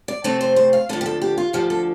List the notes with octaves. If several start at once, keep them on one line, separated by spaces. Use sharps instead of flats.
D5
F2 C3 A3 C4 A4
C5
C5
F5
D2 D3 F3 A4
G4
A4
G4
F4
D2 D3 F3 G4
A4